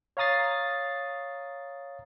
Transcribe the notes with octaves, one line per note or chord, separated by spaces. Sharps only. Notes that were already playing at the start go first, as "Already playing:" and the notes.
C#5 F5 A#5 D#6 A6 C7